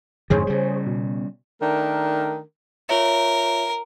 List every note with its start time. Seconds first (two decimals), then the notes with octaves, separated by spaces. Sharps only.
0.30 F2 G#2 D3 G#4 C5 C#5
0.47 C#3 G3
0.87 B2
1.60 D#3 A3 D4 A#4
2.89 F4 A#4 C#5 E5